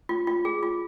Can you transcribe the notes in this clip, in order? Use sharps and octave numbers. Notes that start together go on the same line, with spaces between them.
F4
F4
G#4
F4